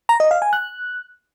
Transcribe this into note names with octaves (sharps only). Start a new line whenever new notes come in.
A#5
D#5
F5
G#5
F#6